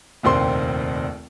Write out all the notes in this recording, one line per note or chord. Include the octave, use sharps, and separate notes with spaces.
F1 A#1 D#2 C4 C6